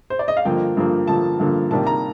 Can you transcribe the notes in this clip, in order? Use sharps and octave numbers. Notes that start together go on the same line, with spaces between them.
C5
D5
D#5
F5
G2 D3 F3 A#3 G5
G2 D3 F3 A#3
G2 D3 F3 A#3 A5
G2 D3 F3 A#3
C3 D#3 G3 A#3 A5
A#5